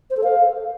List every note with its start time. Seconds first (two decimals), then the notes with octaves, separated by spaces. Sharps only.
0.10 C5
0.17 A4
0.23 F5